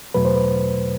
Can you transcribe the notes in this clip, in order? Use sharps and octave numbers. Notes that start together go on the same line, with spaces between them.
E2 B2 F#3 A3 B4
C5
B4